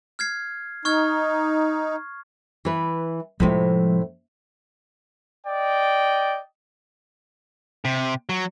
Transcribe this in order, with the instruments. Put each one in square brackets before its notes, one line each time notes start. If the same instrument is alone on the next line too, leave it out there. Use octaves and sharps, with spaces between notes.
[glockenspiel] F6 G#6 C7
[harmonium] D#4 [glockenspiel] C#6 F6 G#6
[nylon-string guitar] E3 B4
[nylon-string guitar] A2 C3 [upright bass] F3 G#3
[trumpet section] D5 D#5 G5
[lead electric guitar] C3
F#3